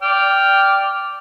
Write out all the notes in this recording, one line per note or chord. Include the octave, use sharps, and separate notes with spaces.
D5 G5 F6